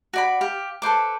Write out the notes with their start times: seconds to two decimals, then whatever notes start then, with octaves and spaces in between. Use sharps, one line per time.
0.13 F#4 D5 B5
0.41 G4 F5
0.82 A4 B4 C5 D6